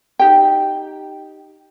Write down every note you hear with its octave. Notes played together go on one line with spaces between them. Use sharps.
D#4 G4 G5